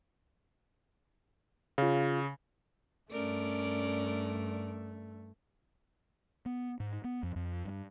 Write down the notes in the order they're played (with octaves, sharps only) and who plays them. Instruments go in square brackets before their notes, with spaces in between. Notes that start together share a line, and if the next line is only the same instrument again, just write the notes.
[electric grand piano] C#3 [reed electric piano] F4 F5
[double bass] G2 A3 [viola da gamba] C#4 A#4 D5
[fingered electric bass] B3
G#2
B3
F2
F2
G2